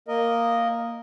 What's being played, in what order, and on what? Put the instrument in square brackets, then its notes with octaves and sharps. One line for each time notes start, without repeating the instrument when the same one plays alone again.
[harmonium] A#3 A#4 D#5